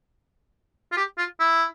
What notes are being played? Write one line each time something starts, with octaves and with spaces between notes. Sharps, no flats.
F4
G4
F4
E4